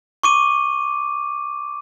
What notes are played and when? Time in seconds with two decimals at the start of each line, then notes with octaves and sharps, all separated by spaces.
0.23 C#6 D6 D#7